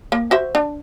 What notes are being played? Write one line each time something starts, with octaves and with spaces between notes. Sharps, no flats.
A#3
F#4 C5 E5
D4